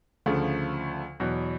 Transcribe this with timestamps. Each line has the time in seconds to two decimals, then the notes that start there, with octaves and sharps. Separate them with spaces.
0.26 D2 C#3 F3 A3
1.20 E2 B2 F#3